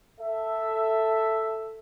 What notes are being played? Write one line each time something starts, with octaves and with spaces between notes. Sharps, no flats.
A4 E5